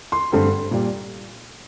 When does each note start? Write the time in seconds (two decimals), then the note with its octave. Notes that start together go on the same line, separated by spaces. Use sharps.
0.12 C6
0.32 G2 D3 A3 C4
0.71 A#2 G3